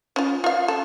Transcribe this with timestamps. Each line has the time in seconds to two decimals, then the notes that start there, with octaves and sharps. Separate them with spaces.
0.16 C#4 F4
0.44 F4 F5
0.68 A4